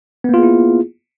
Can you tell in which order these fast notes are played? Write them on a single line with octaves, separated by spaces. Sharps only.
B3 A#3 F4 G#4 E4